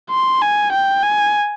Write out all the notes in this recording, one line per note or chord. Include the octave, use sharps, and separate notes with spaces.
C6
G#5
G5
G#5